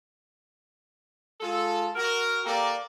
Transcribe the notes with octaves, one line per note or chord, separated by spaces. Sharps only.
G#3 F4 A4
F#4 A#4
A#3 G4 A4 A#4 D5